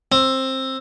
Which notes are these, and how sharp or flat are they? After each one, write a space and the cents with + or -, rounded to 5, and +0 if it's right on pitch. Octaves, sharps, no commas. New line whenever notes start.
C4 +15